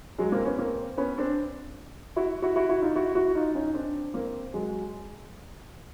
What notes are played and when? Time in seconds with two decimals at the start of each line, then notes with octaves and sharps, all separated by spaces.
0.18 F#3 G#3
0.32 A#3 C4
0.45 B3 C#4
0.58 A#3 C4
0.97 B3 C#4
1.18 C4 D4
2.16 E4 F#4
2.42 E4 F#4
2.56 E4 F#4
2.69 E4 F#4
2.82 D#4 F4
2.95 E4 F#4
3.15 E4 F#4
3.35 D#4 F4
3.55 C#4 D#4
3.74 C4 D4
4.14 A#3 C4
4.54 F#3 G#3